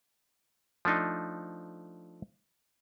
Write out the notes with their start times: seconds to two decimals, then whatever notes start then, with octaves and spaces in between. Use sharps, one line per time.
0.85 F3 A3 D4 D#4